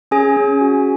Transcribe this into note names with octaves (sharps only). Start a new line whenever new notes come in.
C#4 G#4 G#5
C#4
F#4